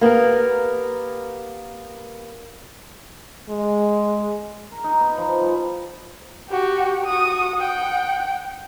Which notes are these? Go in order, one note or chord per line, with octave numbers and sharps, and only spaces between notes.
A#3 B3 G4 A#4
G#3
A#4
D#4
B3
F3
G3
F#4 G4
F#4 D#6
F#5 G5